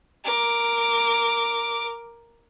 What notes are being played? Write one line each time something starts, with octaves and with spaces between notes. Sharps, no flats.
A#4 D6